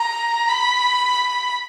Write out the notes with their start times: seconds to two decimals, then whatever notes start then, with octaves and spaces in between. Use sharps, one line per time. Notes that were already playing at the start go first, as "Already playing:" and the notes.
Already playing: A#5
0.48 B5